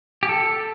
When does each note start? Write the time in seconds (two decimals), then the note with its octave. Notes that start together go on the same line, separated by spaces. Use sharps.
0.23 G4
0.29 A4